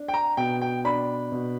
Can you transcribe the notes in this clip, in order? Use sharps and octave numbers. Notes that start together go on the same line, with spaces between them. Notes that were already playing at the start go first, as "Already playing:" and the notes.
Already playing: D4
G5
A#5
B2 G5
G5
D4 B5
B2